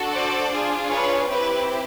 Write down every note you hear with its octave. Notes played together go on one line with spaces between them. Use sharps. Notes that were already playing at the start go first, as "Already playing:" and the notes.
Already playing: D4 F#4 A4
C5 D5
D4 F4 G#4
B4 C#5
C4 E4 G4 B4